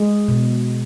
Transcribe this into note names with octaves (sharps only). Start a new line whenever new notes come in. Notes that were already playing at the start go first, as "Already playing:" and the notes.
Already playing: G#3
B2